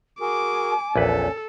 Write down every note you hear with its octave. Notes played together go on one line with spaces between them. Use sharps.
F#4 G#4 A#4 G#5 D6
A#1 E2 C#4 A4 B4